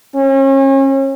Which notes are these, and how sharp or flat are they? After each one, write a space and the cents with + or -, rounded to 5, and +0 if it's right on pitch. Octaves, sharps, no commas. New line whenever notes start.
C#4 -35